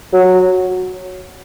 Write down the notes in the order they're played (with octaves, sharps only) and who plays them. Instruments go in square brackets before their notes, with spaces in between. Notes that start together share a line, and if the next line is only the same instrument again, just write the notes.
[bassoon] F#3